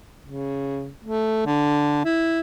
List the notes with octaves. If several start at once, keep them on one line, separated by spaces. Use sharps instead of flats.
C#3
A3
D3
E4